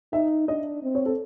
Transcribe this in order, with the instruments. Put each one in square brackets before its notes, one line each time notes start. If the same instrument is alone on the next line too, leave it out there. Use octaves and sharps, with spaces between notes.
[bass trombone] D#4 [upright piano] E5
[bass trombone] D4 [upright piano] D#5
[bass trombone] C4
[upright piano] C#5
A4